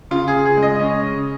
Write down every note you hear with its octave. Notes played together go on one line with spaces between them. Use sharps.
C#3 F4
G#4
C#3
G#4
G#3
D#5
C#4
C#3